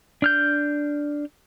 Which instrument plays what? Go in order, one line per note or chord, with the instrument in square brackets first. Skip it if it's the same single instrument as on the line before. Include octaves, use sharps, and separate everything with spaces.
[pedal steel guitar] D4 F6 G6